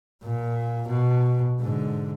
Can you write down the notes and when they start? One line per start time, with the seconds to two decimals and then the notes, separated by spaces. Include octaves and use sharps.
0.23 A#2
0.88 B2
1.60 G#2 D3